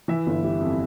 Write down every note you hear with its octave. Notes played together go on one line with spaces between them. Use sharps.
E3 E4 E5
G1
G3
F2